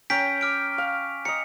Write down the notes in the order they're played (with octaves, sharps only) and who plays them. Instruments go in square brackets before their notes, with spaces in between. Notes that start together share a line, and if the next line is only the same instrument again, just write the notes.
[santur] C#4 G5 A#5 [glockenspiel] B6 D7
[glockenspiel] D6 F6 D7
[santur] F5
[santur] D#5 A#5 [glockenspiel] C#7